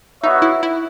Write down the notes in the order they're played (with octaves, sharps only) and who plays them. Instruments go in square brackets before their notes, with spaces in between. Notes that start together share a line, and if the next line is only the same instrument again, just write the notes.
[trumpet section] B3 F#4 C#5 E5 [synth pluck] D#4
[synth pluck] E4
E4